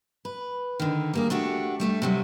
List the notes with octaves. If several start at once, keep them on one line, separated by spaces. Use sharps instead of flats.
B4
D3 D#3
G3 A#3 G#4
A3 D4 F#4 G4
G3 A3 B3 D4
C3 F#3 G3